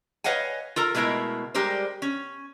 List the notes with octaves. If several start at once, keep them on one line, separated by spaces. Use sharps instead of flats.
B4 C#5 D#5 F5 F#5 G#5
F4 A4 A#4
B2 G#3 A3 E4 A#4
G3 G#3 G4 A#4 C5
C#4